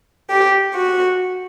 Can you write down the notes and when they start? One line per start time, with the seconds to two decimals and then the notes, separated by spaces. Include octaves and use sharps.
0.30 G4
0.75 F#4